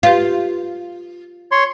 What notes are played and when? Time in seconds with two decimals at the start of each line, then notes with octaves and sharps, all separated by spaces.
0.03 F4 G4 B4 F5
1.52 C#5 C6